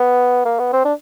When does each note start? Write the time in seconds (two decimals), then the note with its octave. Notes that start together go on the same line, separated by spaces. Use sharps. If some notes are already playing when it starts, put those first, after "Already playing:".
Already playing: B3
0.45 A#3
0.59 B3
0.73 C4
0.85 D4